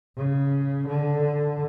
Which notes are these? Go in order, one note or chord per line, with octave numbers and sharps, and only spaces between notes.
C#3
D3